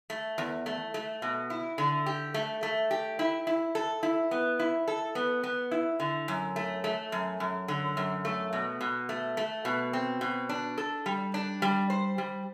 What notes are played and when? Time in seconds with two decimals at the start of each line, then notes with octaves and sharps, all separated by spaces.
0.10 A3
0.38 E2
0.66 A3
0.94 A3
1.22 B2
1.50 E4
1.78 D3
2.06 G4
2.34 A3
2.63 A3
2.91 G4
3.19 E4
3.47 E4
3.75 A4
4.03 E4
4.31 B3
4.59 E4
4.88 A4
5.15 B3
5.43 B3
5.71 E4
6.00 D3
6.28 F#2
6.56 A3
6.84 A3
7.12 F#2
7.40 F#2
7.68 D3
7.97 F#2
8.25 A3
8.53 B2
8.81 B2
9.09 A3
9.37 A3
9.65 B2
9.93 C4
10.21 B2
10.49 D4
10.78 A4
11.06 G3
11.34 D4
11.62 G3
11.90 C5
12.18 G3